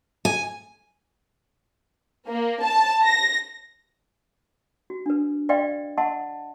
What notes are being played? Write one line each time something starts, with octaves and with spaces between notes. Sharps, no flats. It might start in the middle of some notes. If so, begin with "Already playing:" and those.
G#5
A#3
A5
A#6
F#4
D4 B4
B4 D5 D#5 F5 G5 C6
D#5 F#5 A5 C6